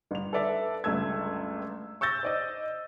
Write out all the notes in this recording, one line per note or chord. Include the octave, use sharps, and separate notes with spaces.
G1 F7
A4 B4 D5 E5
G1 C#2 A3 E6 G#6
C#6 E6 G6 A6 A#6
C5 D5 D#5